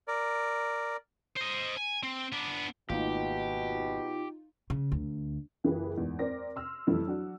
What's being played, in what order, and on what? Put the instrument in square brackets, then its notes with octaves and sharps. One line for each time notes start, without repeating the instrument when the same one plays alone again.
[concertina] A#4 D5
[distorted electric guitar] C5 D#5
G#5
C4
B3 D4
[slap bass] G#1 A3 A#3 [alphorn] B2 [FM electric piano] D#4 F4 [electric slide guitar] G4
[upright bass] C#3
D2
[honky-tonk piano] F#1 E3 F4 G4 G#4 B4
E2 G#2
C4 A#4 D5 D6 A#6
C6 E6 F6
F2 E3 G3 A3 E4
F#3 D4 F#4